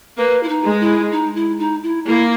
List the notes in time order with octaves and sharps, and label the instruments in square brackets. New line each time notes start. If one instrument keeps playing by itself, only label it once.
[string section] A#3 [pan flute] B4
[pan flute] E4
D#4
[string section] G#3
[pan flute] E4
D#4
E4
D#4
E4
[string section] A#3 [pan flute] E4